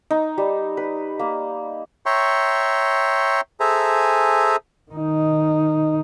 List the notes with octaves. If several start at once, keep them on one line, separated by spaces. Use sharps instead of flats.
D#4
G3
B4
A#3
C#5 E5 G5 A#5 C6 C#6
G#4 A4 C5 E5 G#5 A#5
D#3 D#4